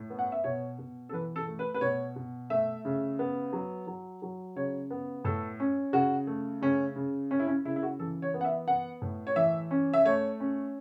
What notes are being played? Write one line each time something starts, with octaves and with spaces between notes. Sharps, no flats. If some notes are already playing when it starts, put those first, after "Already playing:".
Already playing: A2
B3
F#5
E5
B2 C#5
B2
A4
E3 B4
A4
A3
B4
B4
B2 C#5
B2
A3 E5
C#3
B3
F#3
F#3
F#3
C#3 C#5
B3
A2 A4
C#4
C#3 F#4
A3
C#3 C#4
C#3
C#4
E4
C#4
C#3 E4
E4
F#4
E3 A4
C#5
B3
F#5
E5
B3 F#5
A2
C#5
E3 E5
C#4
E5
A3 C#5
C#4